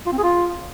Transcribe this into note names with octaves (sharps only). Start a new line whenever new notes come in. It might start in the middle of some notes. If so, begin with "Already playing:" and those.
F4
C4
G#4
F4